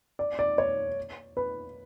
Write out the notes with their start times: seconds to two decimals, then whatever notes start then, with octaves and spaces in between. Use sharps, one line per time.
0.19 D5
0.39 D5
0.58 C#5
1.37 B4